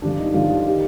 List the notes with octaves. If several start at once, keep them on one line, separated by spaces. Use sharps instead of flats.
G2 D3 F3 D4
D#4
G2 D3 F3 F4
D#3 G3 G4